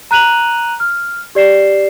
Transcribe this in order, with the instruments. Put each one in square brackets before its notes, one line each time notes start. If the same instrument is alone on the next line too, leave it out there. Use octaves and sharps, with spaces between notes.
[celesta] A#5 F#6 D#7 F7 F#7
F6
G4 D5 C7 E7